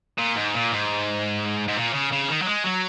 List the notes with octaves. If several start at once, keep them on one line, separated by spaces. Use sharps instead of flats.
A#2
G#2
A#2
G#2
G#2
A#2
C#3
C#3
D#3
F#3
G#3
F#3